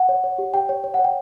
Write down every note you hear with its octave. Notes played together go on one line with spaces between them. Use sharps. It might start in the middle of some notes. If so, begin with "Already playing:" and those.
Already playing: F#5
C#5
C#5
G4
G4 G5
C#5
C#5
C#5 F#5
G5